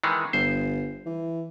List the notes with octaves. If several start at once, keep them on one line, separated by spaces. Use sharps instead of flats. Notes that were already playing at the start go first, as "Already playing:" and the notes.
D#3 E3 G#3
G1 C5
E3